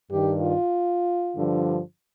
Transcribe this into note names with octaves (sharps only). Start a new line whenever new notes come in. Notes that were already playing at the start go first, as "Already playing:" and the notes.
G2 D#3 G4
F4
G2 D3 F3